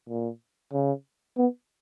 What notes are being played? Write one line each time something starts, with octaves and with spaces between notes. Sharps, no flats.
A#2
C#3
B3